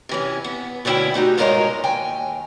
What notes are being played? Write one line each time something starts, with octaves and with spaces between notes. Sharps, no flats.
C3 E3 C#4
B3
D2 B2 D3 C#4 E4 G5
A3 D#4 F#4 G4
G2 A#2 G#3 A#4 C#5 D#5
D#2 G5 G#5